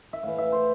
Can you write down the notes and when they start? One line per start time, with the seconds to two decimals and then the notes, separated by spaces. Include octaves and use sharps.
0.13 E5
0.23 A2 E3 F5
0.38 E5
0.52 C5